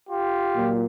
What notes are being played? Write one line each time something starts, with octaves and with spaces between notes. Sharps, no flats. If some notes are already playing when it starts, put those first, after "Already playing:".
F4 G4
A#2 F#3 A#3